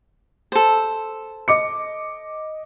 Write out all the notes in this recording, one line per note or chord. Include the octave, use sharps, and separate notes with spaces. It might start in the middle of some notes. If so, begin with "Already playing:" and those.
A4 C5
D#5 D6 C#7